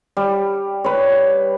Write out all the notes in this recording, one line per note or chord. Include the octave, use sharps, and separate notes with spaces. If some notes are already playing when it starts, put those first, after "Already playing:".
G3
B4 C#5